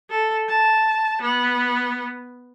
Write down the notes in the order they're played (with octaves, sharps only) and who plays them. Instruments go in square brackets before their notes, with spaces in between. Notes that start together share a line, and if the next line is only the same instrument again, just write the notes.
[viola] A4
A5
B3